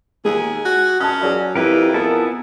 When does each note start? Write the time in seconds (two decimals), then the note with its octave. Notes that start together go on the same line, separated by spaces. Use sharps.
0.25 D#2 G#3 G#4
0.65 F#4
1.00 C#4 A5 D#6
1.21 F#3 G#4 D5
1.55 F2 E4 G4 A#4 B4
1.94 B3 E4 G#4 A#4 A5